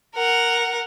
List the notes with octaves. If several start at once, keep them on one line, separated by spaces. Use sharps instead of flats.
A#4 F#5